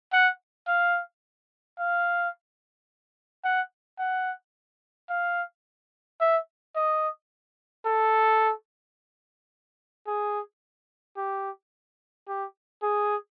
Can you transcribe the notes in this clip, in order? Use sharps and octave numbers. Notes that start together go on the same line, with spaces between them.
F#5
F5
F5
F#5
F#5
F5
E5
D#5
A4
G#4
G4
G4
G#4